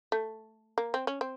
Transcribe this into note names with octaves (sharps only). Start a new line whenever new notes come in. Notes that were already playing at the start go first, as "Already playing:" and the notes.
A3
A#3
C4
C#4
C4